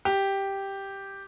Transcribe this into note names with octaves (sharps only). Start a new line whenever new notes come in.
G4